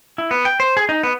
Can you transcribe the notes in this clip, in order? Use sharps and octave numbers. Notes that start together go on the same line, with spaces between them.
E4
B3
G5
C5
G#4
D#4
B3